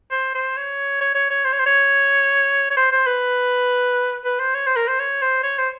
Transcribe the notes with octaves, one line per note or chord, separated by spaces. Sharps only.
C5
C5
C#5
C#5
C#5
C#5
C5
C#5
C5
C#5
C#5
C5
C5
B4
B4
C5
C#5
C5
A#4
C5
C#5
C5
C#5
C5